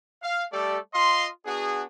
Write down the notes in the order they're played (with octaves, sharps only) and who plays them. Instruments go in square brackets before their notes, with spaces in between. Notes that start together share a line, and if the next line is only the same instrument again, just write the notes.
[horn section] F5
G3 A3 G4 A4 D5
F4 D#5 F5 C6
B3 D4 F#4 G#4